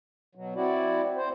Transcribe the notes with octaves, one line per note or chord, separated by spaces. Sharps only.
B2 F#3
C4 E4 F#4 D5
C4 C5